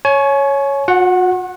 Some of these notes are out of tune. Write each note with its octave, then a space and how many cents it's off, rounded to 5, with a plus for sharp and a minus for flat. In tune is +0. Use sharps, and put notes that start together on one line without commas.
C#5 +0 G#5 +35
F#4 -45 F#5 +0